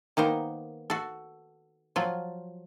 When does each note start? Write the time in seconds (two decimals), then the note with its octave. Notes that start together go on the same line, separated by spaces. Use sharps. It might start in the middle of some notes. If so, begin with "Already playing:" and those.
0.17 D#3 A#3 B3 C5
0.90 F#4 A4
1.96 F3 F#3 F4